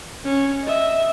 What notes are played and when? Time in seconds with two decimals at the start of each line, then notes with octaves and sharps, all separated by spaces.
0.25 C#4
0.64 D#5 E5